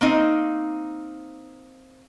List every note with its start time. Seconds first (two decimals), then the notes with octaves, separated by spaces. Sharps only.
0.01 A#3 C4 D#4